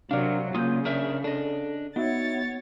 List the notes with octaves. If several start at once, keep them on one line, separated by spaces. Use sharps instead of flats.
C3 F#3 D4 A#4 D5 F5
C#3 A#3 F4 D#6 G6
D4 A#4 E5
D4 A4 D#5
B3 D#4 F#4 C#5 E5 A6